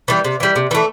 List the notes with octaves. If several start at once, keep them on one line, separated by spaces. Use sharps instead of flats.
E3 G3
C3
E3 G3
C3
E3 A3